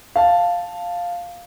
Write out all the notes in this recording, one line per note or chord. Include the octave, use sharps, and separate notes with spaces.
F5 A5